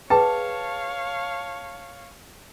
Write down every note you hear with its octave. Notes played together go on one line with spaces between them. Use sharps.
G#4 B4 C#5 F5 G5 A5